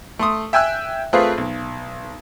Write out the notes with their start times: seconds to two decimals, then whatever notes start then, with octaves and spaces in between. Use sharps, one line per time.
0.19 A3 C6 D#6
0.53 E5 G5 G#5 E6 F#6
1.13 A3 C4 F4 G#4 B4 F5
1.38 B1